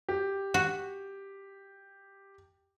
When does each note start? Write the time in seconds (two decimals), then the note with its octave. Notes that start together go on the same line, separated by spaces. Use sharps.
0.09 G4
0.54 F#4